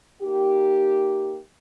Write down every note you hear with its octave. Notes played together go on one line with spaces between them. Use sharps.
A#3 D#4 G4